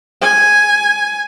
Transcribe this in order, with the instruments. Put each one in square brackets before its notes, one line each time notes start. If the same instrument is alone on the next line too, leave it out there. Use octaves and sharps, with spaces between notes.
[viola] G#5